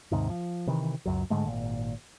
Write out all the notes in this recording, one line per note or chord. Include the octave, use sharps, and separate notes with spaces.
D#2 G#2 C3 D#3
F3
C3 D#3 E3
C#2 F#2 F#3
G#2 D3 G#3 A3
G#1 A#2